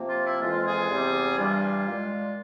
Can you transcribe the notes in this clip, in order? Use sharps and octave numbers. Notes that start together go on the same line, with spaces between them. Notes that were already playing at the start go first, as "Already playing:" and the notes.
Already playing: C3 F3 A#3
F4
E4
F2 E3 G#3 F4
G#4
E2 C3 G3
G2 E3 G3 A#3 F4
A#2 G#3